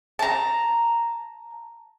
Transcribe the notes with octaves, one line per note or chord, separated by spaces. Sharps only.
A5 A#5